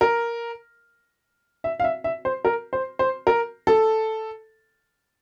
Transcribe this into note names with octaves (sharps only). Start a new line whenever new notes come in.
A#4
E5
F5
E5
E5
C5
A#4
C5
C5
A#4
A4